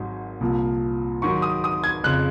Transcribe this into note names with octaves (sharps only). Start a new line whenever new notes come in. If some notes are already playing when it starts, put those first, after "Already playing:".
Already playing: G#1 G#2 F#3
C2 A#2 F3
G#2 D#3 F#3 C#6
D#6
D#6
G#6
F2 C#3 G#3 F#6